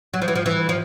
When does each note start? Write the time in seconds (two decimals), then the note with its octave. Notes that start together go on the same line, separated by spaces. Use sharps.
0.14 F#3
0.22 F3
0.28 E3
0.35 F3
0.46 E3
0.69 F3